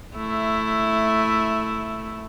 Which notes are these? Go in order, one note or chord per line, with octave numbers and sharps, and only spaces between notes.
A3 E4